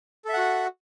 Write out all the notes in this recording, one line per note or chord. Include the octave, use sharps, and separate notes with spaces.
F#4 A4 E5 F#5